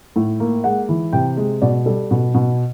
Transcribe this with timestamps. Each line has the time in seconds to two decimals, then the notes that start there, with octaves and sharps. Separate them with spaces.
0.16 A2
0.40 A#3
0.64 G#3 F#5
0.89 E3
1.13 C3 G5
1.37 G#3
1.62 B2 D5
1.86 G3 A4
2.11 B2
2.34 B2